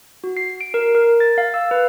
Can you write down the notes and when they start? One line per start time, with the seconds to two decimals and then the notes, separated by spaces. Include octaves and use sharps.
0.24 F#4
0.37 C7
0.61 D7
0.74 A#4
0.95 A#4
1.20 A6
1.38 F5
1.54 E6
1.71 B4